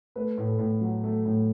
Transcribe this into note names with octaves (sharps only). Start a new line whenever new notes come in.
A3 B4
A2
A4
A2
F#3
A3
A2